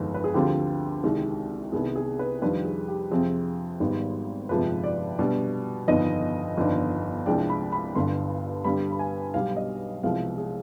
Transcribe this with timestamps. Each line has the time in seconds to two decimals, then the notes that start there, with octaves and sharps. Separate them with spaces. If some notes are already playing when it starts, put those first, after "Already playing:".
Already playing: G1 F2 D#3 G#3
0.14 B4
0.24 G#4
0.34 D2 D3 F3 C4 F4 G4
1.04 C2 C3 D#3 G#3
1.72 C2 C3 D#3 B3 G#4
1.96 G#4
2.19 B4
2.42 F2 D#3 G3 D4 F4 B4
2.65 G#4
2.88 G4
3.11 F2 C3 F3 C4 G#4
3.80 G#1 G#2 G3 B3 D#4
4.49 G1 F2 C3 F3 G#3 B4
4.84 D5
5.19 B2 G3 B3 D4
5.88 G1 F2 D#3 B3 D#4 D#5
6.57 G1 F2 D#3 B3 D4
7.26 C2 C3 F3 G#3 D4 G5
7.50 B5
7.72 B5
7.95 G1 G2 D3 C6
8.64 G2 D3 G3 B5
8.92 B5
8.99 G#5
9.34 B1 B2 G3 F5
9.57 D#5
10.03 C2 C3 F3 G#3 B3 F5
10.38 G#4